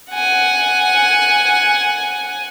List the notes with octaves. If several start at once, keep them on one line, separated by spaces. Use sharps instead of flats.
F#5 G#5